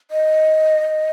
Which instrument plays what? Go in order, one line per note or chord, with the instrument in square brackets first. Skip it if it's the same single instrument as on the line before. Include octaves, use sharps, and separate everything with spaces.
[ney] D#5